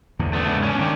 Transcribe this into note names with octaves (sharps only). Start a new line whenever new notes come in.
E2 A2 D3
A3 B3 D4
G#2 C#3
C#4 D4
D#3 D4 D5 G5